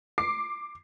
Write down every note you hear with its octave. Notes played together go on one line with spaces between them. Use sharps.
D6 C7